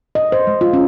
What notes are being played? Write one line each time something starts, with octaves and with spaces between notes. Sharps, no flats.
D#5
C5
G#3
F4
C#4